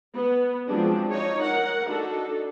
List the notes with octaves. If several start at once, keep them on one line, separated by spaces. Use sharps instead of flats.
B3
F3 F#3 G#3 C4 D4 G#4
D#4 F4 C#5
A#4 F#5
D4 D#4 F#4 A4